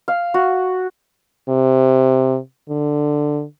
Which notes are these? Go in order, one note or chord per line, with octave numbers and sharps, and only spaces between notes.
F5
F#4
C3
D3